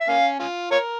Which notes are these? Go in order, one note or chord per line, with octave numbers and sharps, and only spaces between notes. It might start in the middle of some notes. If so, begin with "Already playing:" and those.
E5
A#3 C#4 F5
C#4 F4
F4 A#4 C#5